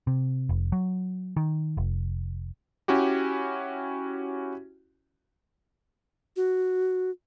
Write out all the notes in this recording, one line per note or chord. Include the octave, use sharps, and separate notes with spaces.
C3
F1
F#3
D#3
F1
C#4 E4 F#4 G4
F#4